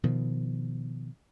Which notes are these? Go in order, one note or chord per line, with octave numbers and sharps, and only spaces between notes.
B2 D#3 F3